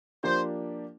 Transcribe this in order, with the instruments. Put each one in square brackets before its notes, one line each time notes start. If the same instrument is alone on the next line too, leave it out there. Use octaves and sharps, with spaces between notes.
[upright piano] F3 A#3 D4 G4 [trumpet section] C5